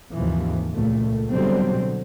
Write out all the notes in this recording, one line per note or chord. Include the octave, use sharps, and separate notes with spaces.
D#2 G#2 C3 E3 F3
C#2 A#2 A3
B2 D3 F#3 G3 C4